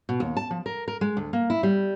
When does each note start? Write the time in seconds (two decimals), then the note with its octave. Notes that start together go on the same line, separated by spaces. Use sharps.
0.09 B2
0.20 D#2
0.37 A5
0.51 F3
0.66 A#4
0.88 A#4
1.01 G#3
1.17 D2
1.33 A#3
1.50 E4
1.63 G3